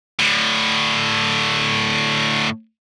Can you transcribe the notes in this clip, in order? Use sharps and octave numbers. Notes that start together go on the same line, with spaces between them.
A2 D3